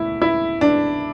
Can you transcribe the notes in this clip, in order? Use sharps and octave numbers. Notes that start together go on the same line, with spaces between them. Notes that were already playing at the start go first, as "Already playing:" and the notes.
Already playing: E1 D2 E4
E4
D4